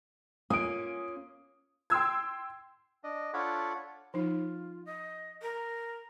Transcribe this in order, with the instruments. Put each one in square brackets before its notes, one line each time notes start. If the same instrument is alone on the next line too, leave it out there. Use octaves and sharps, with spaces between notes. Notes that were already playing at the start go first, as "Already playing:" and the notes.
[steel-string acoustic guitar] A#3 C#4 F4 [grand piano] D#6 D7
[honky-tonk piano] G5 C6 E6 G#6
[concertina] D4 D#5
D4 F4 A4 C#5 F#5 B5
[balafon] F3 D#4 [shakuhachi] F4
[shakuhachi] D#5
A#4